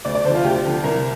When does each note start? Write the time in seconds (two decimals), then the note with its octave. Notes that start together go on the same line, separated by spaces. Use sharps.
0.05 D2 D5
0.15 D5
0.24 D3 C5
0.30 F3
0.35 F4
0.44 D2 G4
0.65 D3 F3
0.84 C2 A#4